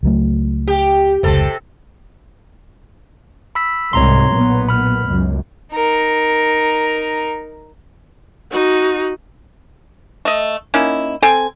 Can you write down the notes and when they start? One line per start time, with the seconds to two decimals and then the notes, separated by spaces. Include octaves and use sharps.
0.03 C#2 F#3 A3
0.68 G4
1.23 F1 C#2 C3 A4
3.55 B5 E6 B6
3.93 C2 G#2 C3 C#5 A#5 C6
4.30 B1 A#2 B3
4.69 B5 F6
5.06 C#2 F#2
5.73 D#4 A#4
8.51 D#4 F#4
10.25 A3 D#5
10.74 A#3 C#4 D#4 E4
11.22 C4 A4 G5 G#5